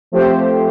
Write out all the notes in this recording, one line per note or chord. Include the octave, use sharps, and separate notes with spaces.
F3 A3 C4 G4 C5